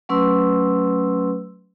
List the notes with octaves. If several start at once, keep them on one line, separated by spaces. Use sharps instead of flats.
F#3 A3 C#4 B4 C6 E6